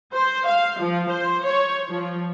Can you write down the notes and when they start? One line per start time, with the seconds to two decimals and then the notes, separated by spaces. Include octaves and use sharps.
0.13 C5
0.47 F5
0.81 F3
1.10 C5
1.44 C#5
1.90 F3